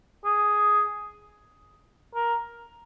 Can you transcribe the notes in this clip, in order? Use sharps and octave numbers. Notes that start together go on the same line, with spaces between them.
G#4
A#4